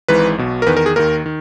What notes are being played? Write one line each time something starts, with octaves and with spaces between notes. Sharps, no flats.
G#1 G#2 E3 B4
B1 B2
A#4
E2 D#3 B4
A#4
G#4
D#2 D#3 A#4
D#3